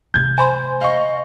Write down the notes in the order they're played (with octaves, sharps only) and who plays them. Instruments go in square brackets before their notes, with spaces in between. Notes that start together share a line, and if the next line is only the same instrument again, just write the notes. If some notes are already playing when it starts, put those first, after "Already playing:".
[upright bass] C3 A3 [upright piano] G6 G#6
[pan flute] C5 [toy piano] G#5 B5 C6
[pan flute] D#5 [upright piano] F5 C#6